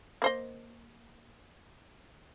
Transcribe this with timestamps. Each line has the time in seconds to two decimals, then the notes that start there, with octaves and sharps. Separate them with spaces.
0.22 A#3 C5 D#5